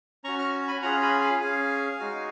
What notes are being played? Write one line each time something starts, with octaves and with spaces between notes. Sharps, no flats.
C#4 F#4 A#5 C#6
C#6 F6
G#5 B5
C#4 F4 G#4 F#5 A#5
G#5 B5
F5 G#5
C#4 G#4 F5 G#5
G#3 D#4 F#4